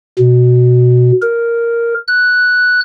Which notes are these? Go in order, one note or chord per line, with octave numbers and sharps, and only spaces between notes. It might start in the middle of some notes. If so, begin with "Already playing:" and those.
B2
A#4
F#6